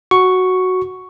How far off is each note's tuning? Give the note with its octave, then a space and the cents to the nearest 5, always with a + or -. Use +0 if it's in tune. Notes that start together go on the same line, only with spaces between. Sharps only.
F#4 +0 C#6 +0